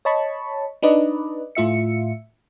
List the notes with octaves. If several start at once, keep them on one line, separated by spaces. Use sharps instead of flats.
C#5 D#5 A5 B5 C#6
D4 D#4 B4 D5 D#5
A2 F4 E5 C#7